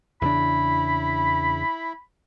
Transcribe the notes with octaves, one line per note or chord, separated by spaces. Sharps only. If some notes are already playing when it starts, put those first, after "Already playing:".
E2 C#3 D4 E4 B5